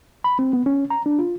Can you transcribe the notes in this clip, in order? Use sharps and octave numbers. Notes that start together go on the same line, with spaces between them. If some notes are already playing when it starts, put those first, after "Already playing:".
B5
C4
B3
C#4
A#5
D4
F4